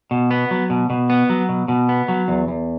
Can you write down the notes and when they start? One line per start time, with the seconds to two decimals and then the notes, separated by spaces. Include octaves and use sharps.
0.11 B2
0.31 B3
0.51 F#3
0.70 B2
0.90 B2
1.10 B3
1.30 F#3
1.49 B2
1.68 B2
1.89 B3
2.08 F#3
2.28 E2
2.48 E2